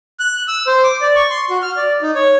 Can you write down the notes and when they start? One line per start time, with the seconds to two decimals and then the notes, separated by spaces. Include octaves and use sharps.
0.20 F#6
0.48 E6
0.67 C5
0.84 D6
1.01 D5
1.16 C#6
1.30 C6
1.50 F#4
1.62 F6
1.77 D5
2.02 D#4
2.15 C#5